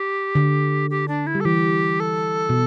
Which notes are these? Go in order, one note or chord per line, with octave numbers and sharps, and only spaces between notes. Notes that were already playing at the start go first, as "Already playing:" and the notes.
Already playing: G4
D3
G4
D4
E4
G3
A4
E3 G4
A4
B2